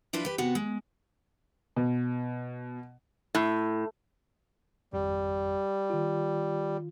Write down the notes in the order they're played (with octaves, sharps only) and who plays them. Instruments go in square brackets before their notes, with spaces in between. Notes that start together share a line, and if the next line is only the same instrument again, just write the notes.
[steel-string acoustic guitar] F3 D4 E4 F4 B4
G4 B4
C3 B3 F#4
G#3
[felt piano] B2
[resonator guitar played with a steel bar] A2
[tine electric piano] G#1 F2 [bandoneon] G3
[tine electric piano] D#3 F4